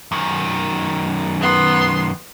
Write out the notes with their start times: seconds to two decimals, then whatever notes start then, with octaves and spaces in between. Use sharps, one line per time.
0.12 F#2 D#3
1.41 B3 C6